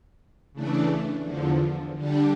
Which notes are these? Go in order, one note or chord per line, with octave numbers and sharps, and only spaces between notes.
C#3 E3 A3 D4
E2 D3 F3
D3 G3 D4